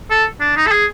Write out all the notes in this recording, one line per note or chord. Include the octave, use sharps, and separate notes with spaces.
A4
D4
D#4
A4
G#4